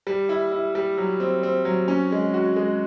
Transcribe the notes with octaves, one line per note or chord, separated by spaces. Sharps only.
G3
E4
E4
G3
F#3
C4
C4
F#3
C#4
G#3
F#4
G#3